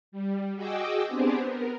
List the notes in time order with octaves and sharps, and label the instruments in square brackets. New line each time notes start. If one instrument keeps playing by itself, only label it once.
[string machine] G3
F#4 G#4 D#5 G5 D6 E6
B3 C4 D4 G4 G#4 C5
B3 A#4